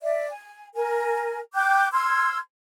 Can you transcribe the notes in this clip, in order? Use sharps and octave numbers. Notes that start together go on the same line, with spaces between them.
D5 E5
G#5
A#4 G#5
G5 D6 F#6 G6
C6 E6 F6 G#6